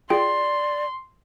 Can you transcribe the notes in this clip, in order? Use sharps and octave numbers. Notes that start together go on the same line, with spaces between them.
F4 G#4 D5 G5 C6